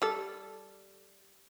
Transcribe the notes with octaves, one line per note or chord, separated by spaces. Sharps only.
G3 A4